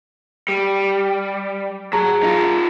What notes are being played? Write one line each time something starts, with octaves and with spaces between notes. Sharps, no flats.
G3
F#3 G#4 A5 A#5
D#4 F4